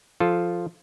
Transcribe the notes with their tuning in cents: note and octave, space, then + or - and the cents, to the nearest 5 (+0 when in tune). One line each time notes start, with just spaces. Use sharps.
F3 -5 F4 +0 A4 -10